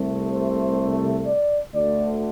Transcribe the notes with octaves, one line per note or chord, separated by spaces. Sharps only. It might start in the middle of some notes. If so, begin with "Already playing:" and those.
Already playing: C2 C3 A3
C5
D5
D2 D3 A3 D5